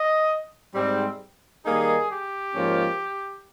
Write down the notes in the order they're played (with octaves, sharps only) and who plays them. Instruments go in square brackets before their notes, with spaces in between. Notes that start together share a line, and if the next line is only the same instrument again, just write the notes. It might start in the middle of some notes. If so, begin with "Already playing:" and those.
Already playing: [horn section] D#5
G#2 G3 C4
D#3 G3 A#3 D#4 G#4
G4
G#2 F3 A#3 C#4 F4